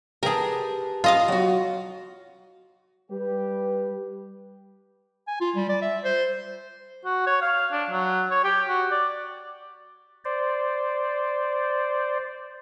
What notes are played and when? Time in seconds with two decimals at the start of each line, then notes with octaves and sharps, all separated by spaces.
0.23 G4 G#4 A#4 B4 A5
1.04 F4 D#5 F5
1.28 F#3 F#4
3.11 G3 G4 B4
5.28 G#5
5.40 F4
5.56 G3
5.69 D5
5.82 E5
6.04 C5
7.05 F#4
7.27 C#5
7.42 F5
7.72 D4
7.90 F#3
8.31 C#5
8.44 G4
8.69 F#4
8.92 D5
10.25 C5 D5